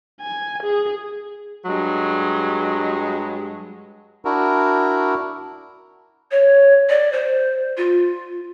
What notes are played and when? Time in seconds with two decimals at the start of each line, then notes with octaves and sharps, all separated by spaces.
0.21 G#5
0.63 G#4
1.65 G2 F#3 G#3
4.25 D4 E4 F#4 A#4
6.31 C#5
6.89 D5
7.12 C5
7.77 F4